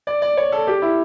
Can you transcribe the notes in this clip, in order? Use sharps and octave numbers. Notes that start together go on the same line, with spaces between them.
D5
D5
C#5
A4
G4
E4